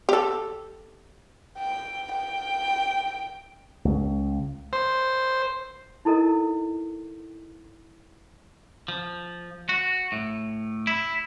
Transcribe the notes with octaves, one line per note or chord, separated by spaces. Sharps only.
G4 A4
G5
G5
C#2
C5
D#4 E4 A4 A#4 D#5
F3
F#4
A2
E4